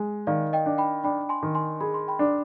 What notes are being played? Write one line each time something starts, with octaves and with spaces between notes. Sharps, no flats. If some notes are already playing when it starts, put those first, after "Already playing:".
Already playing: G#3
D#3 D5 F5
D#5 G5
D4
G5 B5
D4 G5 B5
G#5 C6
D#3
G#5 C6
G#4 B5
C6
G5 B5
D4